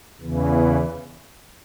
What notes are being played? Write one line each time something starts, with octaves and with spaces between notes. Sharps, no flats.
E2 C#3 E3